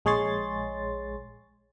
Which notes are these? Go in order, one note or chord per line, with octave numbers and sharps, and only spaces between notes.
A#1 G#3 G#4 C#5 C6 A6